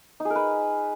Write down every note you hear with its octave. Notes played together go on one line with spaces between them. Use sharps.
D#4
G#4
A#4
B4